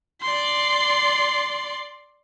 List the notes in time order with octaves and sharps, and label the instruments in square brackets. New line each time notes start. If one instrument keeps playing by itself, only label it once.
[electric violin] D5 C6